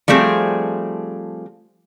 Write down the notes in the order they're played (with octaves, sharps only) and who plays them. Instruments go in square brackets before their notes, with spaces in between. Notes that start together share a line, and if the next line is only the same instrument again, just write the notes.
[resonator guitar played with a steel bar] F3 G3 A3 C4 G#4